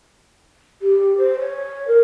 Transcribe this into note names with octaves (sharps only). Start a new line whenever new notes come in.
G4
C5
C#5
A#4